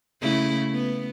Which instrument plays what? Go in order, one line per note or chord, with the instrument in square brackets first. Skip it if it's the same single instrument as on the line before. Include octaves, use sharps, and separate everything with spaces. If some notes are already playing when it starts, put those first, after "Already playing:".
[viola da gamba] C#3 A3 E4
B3